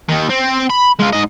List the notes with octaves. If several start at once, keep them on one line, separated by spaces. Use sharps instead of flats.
D#2 D#3
C4
B5
G#3 F4
G#2 D#5